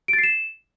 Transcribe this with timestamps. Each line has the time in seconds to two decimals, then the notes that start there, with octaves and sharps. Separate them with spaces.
0.08 D7
0.13 A6
0.18 C7
0.23 E7